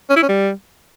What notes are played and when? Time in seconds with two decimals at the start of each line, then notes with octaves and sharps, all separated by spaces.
0.10 C#4
0.16 E4
0.22 C#4
0.29 G3